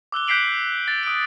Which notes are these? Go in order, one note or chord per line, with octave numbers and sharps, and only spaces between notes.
D6 E6 F#6 G7
F#6 G6 B6 C7 D7 F#7
G6
A6
D#6 D7